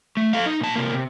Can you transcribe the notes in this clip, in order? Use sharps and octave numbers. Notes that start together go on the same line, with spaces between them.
A3
A4 F5
D#4
A#2 A5
C3 A#3
C3